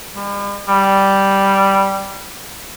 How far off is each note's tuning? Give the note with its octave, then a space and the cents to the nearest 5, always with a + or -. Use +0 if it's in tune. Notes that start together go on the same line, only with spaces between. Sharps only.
G3 +45
G3 -5